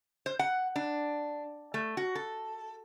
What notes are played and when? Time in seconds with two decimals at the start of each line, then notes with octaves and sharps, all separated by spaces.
0.26 C5
0.39 F#5
0.76 D4
1.74 A3
1.97 F#4
2.15 A4